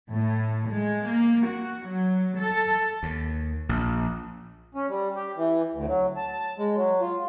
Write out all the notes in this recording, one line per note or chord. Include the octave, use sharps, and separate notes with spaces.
A2
G#3
A#3
F#4
F#3
A4
D#2
A#1
C#4
G3
G4
E3
D2
F#3
A5
G#3
F#3
F4